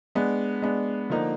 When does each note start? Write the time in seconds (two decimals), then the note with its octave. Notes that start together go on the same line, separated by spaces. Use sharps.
0.15 G#3 B3 D4
0.62 G#3 B3 D4
1.10 D3 F3 A#3 D#4